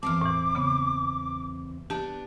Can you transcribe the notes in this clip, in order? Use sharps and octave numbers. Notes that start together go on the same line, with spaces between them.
E2 G2 C4 A5 D6 F6
A2 E3
C#3 B3
B3 D4 G4 A5